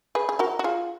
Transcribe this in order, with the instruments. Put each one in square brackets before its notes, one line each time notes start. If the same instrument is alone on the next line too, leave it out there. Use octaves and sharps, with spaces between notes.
[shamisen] G#4 B4
G#4
F#4 A#4
F#4
F4 G#4